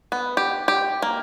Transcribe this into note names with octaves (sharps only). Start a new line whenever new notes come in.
B3
G4
G4
A#3